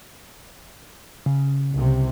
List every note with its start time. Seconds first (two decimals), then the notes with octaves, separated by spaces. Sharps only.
1.26 C#3
1.73 C2 C3